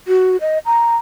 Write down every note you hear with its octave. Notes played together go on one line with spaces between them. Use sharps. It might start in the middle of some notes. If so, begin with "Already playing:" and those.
F#4
D#5
A#5